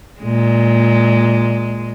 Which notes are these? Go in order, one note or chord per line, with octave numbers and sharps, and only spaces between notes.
A#2 G#3